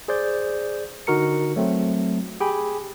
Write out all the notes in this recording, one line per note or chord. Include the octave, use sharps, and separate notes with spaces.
G#4 C5 D5 G6
D3 D#4 F#4 A#4 A#5 C#7
F#3 A3 C4
G4 G#4 G5 G#5 B5